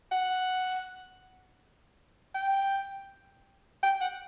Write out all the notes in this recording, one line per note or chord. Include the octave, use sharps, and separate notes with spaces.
F#5
G5
G5
F#5